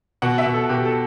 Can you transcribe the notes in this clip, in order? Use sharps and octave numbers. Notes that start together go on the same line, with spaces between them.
B2 F#5
E5
B2
A4
B2 G4
A4